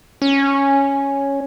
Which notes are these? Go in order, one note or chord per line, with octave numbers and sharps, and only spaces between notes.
C#4